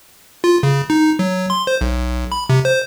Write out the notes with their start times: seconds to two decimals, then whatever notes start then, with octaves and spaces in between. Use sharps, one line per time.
0.44 F4
0.63 C#3
0.90 D#4
1.19 F#3
1.50 C6
1.67 C5
1.81 B1
2.32 B5
2.49 C3
2.65 C5